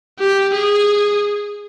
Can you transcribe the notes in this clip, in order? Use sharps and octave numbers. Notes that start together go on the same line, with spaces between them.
G4
G#4